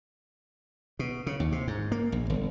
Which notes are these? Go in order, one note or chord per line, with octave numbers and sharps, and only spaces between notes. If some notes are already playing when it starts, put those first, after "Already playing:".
B2
C#3
D#2
C3
G#2
A#3
A#1
G1